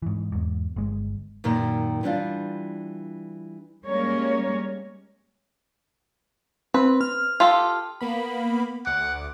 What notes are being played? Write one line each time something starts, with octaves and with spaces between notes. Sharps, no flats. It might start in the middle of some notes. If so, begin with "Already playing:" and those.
G#2 E3
E2 G#2
G1 G#3
F#2 A#2 D#3
E3 G3 D4 F4
G3 G#3 A#3 C#4 A#4 C#5
C4 B4
F6
F4 G4 A4
A#3 B3 B5
D2 F#5 D6